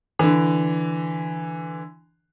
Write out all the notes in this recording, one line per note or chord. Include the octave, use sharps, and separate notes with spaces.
D3 E3